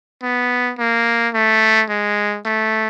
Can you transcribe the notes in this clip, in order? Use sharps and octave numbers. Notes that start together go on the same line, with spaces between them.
B3
A#3
A3
G#3
A3